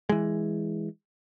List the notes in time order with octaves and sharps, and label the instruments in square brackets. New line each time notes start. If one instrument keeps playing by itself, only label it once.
[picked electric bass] E3 G#3